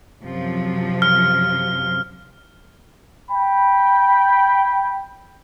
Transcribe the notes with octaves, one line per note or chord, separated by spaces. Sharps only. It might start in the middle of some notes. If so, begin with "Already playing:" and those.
F#2 C3 F3
F6
G5 B5